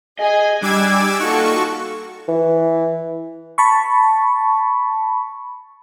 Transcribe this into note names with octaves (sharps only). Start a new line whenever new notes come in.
G#4 D#5 G#5
G3 D4 G#5 D6 E6 G#6
A#3 D#4 F4 F#4 A4 C#6
E3
A5 B5 C#6